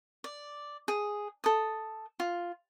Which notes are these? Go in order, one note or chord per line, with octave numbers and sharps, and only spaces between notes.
D5
G#4
A4 D#6
F4